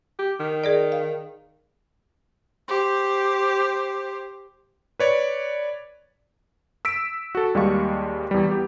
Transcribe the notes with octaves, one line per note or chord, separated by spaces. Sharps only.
G4
D#3
G#4 A#4 D5
F5
G4 C5
B4 C#5 D5
E6 B6 D7
F#4 A4
D#2 G3 G#3 F5 C#6
E2 G3
B3 G4